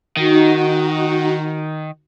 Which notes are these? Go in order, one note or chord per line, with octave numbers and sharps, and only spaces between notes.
D#3 D#4 F#4